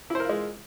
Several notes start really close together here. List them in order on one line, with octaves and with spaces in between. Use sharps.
E4 C5 A#4 F4 G#3